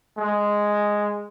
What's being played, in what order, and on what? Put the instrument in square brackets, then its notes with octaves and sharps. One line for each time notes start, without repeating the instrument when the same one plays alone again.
[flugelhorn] G#3